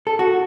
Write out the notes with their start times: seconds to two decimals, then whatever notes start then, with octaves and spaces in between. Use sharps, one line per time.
0.07 A4
0.19 F#4